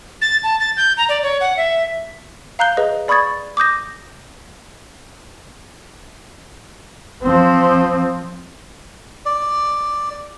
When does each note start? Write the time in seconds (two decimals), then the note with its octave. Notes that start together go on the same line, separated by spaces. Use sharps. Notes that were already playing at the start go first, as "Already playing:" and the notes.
0.22 A6
0.43 A5
0.60 A6
0.77 G6
0.97 A#5
1.09 D5
1.23 C#5
1.41 F#5
1.57 E5
2.59 F5 A#5 F#6 G6 G7
2.77 G#4 B4 D#5
3.08 D5 B5 C#6 D#6 G#6 A6
3.57 D6 D#6 G6 A#6
7.23 F3 C4
9.26 D5